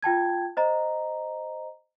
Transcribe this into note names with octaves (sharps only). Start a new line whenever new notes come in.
F4 G5 A5 G#6
C5 D#5 A#5